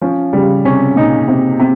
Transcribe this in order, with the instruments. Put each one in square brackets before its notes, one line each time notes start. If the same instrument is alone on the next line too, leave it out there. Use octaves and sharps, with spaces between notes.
[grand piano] F3 [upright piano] C#4
[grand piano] C#3 [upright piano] G3
[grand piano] C3 [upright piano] C#4
[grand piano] A#2 [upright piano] D#4
[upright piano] C3
C3